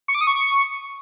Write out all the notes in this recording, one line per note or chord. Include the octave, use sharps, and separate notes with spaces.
C#6
D6
D#6
C#6